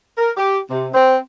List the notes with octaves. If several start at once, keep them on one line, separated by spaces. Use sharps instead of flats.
A#4
G4
C3
C4